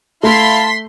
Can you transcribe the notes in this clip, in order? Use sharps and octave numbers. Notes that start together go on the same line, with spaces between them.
A3 E4 F5 A5 C6 B6